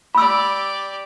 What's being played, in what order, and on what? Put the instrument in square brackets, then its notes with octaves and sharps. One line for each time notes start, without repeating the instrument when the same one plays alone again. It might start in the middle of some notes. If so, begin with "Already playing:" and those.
[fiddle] G4 D5 [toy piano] B5 E6